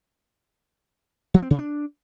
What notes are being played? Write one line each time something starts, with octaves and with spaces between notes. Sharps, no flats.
F3
C4
C3
D4